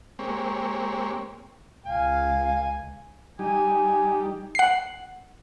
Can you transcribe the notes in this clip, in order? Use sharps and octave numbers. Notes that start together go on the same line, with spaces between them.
G#3 A#3 C4 G4 C#5
C#2 F5 G#5
G3 D#4 G4 G#5
F#5 C7